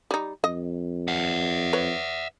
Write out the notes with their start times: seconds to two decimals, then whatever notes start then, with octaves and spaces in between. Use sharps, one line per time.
0.11 G3 D#4
0.44 F2 D#5
1.08 E5 F#5
1.73 B4 C#5